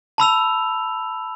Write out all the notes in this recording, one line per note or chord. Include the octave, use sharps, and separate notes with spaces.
A5 B5 E6 F7